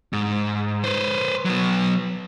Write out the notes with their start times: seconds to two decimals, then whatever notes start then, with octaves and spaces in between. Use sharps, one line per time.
0.13 G#2
0.84 B4 C5
1.45 F#3 B3